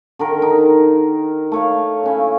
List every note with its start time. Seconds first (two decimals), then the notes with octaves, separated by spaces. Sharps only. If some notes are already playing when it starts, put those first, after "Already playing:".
0.19 D3 D#3 A#4
0.42 D#4
1.52 A3 C#5 F5
2.04 C#3 C#4 E4